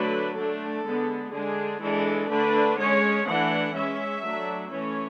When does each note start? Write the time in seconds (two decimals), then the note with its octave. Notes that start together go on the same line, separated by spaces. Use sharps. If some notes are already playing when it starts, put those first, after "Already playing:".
Already playing: D3 F#3 A3 D4 B4
0.36 D3 A3 D4 A4
0.84 D3 G#3 B3 D4
1.32 D3 G#3 D4 G#4
1.80 E3 G#3 D4 A4
2.29 D3 A3 D4 B4
2.78 G#3 C#4 C#5
3.27 E3 A3 D4 F#5
3.75 G#3 C#4 E5
4.23 F#3 A3 D4
4.71 E3 A3 C#4 C#5